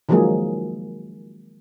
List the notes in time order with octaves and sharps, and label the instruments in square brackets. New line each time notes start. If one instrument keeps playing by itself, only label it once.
[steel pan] D#3 F3 F#3 G#3 A#3 G#4